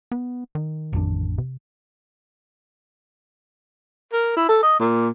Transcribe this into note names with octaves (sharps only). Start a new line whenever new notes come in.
B3
D#3
A1 F2 D4
C3
A#4
E4
A4
D#5
A#2